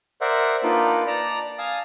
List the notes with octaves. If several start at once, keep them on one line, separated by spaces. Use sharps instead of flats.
A#4 C5 D5 E5 F#5
A#3 D4 D#4 F4 B4 D5
D5 A5 A#5
F5 G#5 A5 D#6